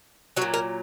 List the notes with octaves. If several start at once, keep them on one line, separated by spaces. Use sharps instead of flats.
F#3 F#4
A#2
A#4